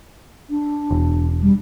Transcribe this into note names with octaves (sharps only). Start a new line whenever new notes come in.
D4
E1
G3